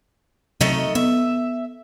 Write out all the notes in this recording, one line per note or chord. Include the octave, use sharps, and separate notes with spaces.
C3 D#3 F#3 A3 D#5
B3 E5